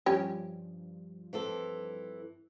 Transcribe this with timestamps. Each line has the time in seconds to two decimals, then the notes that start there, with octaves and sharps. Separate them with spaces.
0.06 G2 F3 C#4 G4
1.33 E3 C4 A4